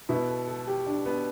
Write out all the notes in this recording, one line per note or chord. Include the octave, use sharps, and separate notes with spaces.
B2 B3 E4
A4
A4
G4
D4
B3